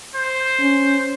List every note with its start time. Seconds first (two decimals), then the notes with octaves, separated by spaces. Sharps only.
0.15 C5
0.60 C#4